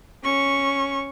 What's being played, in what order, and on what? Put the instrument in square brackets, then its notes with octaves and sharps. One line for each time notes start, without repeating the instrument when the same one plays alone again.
[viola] C#4 C#6